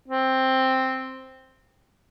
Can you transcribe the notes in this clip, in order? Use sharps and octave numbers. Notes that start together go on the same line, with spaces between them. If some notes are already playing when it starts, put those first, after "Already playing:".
C4